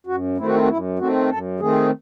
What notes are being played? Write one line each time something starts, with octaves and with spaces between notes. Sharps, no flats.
F#2 F#4
D#3 A3 C4 E4
F#4
E4
F#4
F#2 E4
D#3 A3 C4 F#4
F#2 A4
D#3 A3 C4 G#4